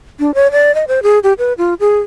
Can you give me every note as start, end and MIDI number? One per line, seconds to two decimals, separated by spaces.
0.19 0.34 62
0.34 0.51 73
0.52 0.74 74
0.75 0.85 75
0.88 1.03 72
1.03 1.19 68
1.23 1.33 67
1.38 1.53 71
1.58 1.74 65
1.80 1.98 68